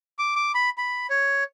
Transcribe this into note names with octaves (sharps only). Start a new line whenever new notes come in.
D6
D6
B5
B5
C#5